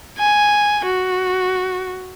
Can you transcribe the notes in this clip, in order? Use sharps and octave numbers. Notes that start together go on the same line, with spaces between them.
G#5
F#4